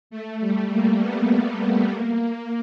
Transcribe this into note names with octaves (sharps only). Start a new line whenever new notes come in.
A3
G3
A#3
B3
A#3
A#3